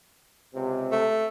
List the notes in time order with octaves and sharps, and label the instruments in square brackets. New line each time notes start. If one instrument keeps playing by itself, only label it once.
[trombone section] C#2 C3
[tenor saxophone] A3